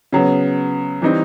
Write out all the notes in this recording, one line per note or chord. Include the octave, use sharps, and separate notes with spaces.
C#3 F#3 B3
E3 G3 C4 D#4